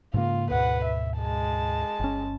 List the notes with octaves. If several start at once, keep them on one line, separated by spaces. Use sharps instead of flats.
G#2 C#3 A#3 F4
D2 G#2 B2 B4 F#5
E5
G#3 A5
G1 C#4